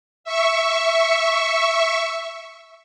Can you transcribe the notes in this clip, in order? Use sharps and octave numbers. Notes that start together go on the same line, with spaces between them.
E5 C#6